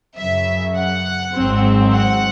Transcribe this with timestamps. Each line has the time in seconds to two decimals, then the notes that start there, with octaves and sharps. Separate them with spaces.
0.19 F#2 C#3 F#3 E5
0.77 F#5
1.35 G#1 G#2 F#3 C4
1.94 F#5